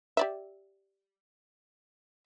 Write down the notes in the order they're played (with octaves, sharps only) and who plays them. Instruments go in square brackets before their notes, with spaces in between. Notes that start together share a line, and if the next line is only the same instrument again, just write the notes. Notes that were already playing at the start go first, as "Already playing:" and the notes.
[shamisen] G4 D5 E5